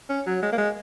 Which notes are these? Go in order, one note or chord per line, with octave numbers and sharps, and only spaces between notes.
C#4
F#3
G#3
A#3
G#3